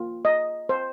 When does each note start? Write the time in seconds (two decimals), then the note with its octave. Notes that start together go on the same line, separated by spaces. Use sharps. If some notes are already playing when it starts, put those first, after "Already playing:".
Already playing: A#3 F4
0.25 D#5
0.69 C5